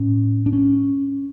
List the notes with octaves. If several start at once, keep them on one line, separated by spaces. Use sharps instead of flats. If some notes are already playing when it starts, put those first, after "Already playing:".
Already playing: A2 C#4
D4
C#4